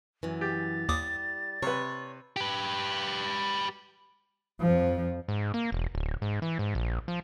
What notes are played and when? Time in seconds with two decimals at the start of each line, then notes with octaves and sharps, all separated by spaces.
0.23 F#2 E3
0.41 G4 A6
0.89 D#2 G3 D6 D#6
1.63 C3 B4 C#5
2.37 G4 B4
4.61 F2 F3
5.28 G#2
5.54 A#3
5.72 E1
5.95 D1
6.22 G#2
6.42 E3
6.59 G#2
6.75 A#1
7.08 F3